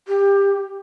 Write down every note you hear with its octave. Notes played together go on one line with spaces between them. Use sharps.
G4